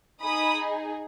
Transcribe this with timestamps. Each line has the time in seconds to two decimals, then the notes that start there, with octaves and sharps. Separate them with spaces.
0.22 D#4 G#4 B5 D#6